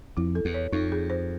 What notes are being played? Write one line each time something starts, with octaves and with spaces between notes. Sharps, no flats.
F2 E4
A4
E2
C#5
F2 D#4
G#4
C5